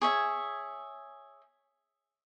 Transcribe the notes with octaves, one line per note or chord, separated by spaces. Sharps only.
G#4 C#5 E5